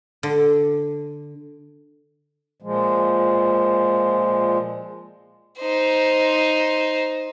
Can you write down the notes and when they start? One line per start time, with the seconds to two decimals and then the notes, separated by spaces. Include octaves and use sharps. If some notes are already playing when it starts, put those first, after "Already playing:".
0.23 D3
2.62 A#2 F3 G#3
5.60 D#4 C5